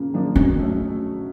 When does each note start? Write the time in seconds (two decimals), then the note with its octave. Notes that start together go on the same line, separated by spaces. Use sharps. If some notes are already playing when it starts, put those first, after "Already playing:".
Already playing: C#3 F3 A#3
0.14 F3 A#3 D4
0.35 B2 C#4
0.57 F#3 A3 C#4